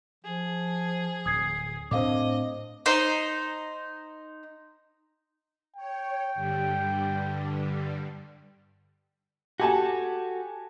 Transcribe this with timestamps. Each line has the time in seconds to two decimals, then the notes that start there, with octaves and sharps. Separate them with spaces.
0.25 F3 G#4
1.26 D1 D#6 G#6 C7
1.91 A2 C4 D4 C5 D#5 F5 D6
2.86 D#4 C5
5.76 C#5 G5
6.35 G2 D3 G3
9.60 F#4 G4 A4 G#5 A5